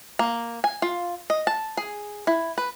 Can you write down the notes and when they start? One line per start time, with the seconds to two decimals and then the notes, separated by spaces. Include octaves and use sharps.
0.19 A#3
0.64 G#5
0.82 F4
1.30 D#5
1.47 A5
1.77 G#4
2.27 E4
2.58 B4